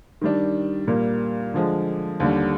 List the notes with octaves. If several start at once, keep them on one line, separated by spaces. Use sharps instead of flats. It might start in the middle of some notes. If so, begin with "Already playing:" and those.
D#3 G3 D4
A#2 G3 A#3
D3 F3 G#3
D#2 D3 G3